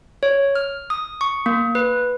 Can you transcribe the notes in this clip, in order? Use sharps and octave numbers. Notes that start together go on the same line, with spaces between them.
C#5
F6
D#6
C#6
A#3
B4